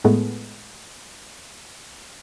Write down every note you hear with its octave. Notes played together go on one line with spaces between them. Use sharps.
A2 G#3 A3 B3